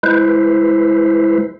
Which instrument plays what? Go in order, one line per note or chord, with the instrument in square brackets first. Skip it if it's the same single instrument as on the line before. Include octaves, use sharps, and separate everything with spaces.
[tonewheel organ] G#3 E4 B4 C5